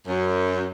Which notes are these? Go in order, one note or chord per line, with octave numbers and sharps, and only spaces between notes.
F#2